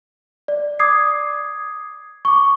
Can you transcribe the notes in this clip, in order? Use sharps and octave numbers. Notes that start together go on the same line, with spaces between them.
D5
D6 D#6 G#6 C7
C#6 D6